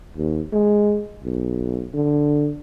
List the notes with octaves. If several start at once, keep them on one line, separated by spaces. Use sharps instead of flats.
D#2
G#3
B1
D3